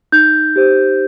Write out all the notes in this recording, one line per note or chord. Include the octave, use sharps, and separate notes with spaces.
D#4 G6
G4 C5